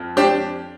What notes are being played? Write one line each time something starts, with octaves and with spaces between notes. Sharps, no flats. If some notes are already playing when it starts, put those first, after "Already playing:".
Already playing: F2 F3
D4 G4 C5